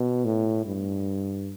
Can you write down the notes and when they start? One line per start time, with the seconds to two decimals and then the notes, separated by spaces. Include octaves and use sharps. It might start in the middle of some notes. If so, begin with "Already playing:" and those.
Already playing: B2
0.25 A2
0.66 G2